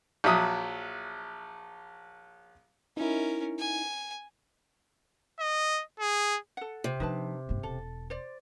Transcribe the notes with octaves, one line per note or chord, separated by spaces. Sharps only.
A#1 F#3 E5 D#6
C#4 D#4 E4 A#4
G#5
D#5
G#4
A4 F#5
C3
F3 D4 D#4 B4 A5
G1 G#2
E1 A4
C5 D5